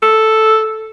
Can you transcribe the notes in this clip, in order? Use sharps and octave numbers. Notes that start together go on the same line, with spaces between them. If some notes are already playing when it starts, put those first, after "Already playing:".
A4